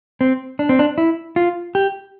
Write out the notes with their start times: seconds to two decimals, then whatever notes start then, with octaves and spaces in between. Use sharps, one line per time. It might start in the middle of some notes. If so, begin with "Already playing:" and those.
0.21 C4
0.59 D4
0.69 C4
0.79 D4
0.98 E4
1.36 F4
1.75 G4